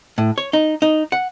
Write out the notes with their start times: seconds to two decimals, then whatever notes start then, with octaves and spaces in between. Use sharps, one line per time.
0.18 A2
0.38 C#5
0.53 D#4
0.82 D#4
1.12 F#5